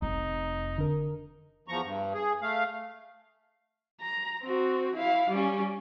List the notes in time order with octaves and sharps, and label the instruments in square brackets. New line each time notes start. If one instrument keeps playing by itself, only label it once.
[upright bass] F1 [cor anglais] D#4
[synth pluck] D3 A#4
[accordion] E2 F3 A#5 C#6
G2
G#4
A3 F5
[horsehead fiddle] A#5
C4 F#4
E4 F5
G3 C#4